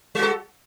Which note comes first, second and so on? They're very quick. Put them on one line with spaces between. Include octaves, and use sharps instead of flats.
G3 F#4 A4